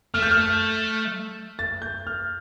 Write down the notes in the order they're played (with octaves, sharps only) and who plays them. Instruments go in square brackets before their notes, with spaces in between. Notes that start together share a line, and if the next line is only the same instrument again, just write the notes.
[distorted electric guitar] A3 [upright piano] F6
[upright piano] G6
F6
A6
G6
F6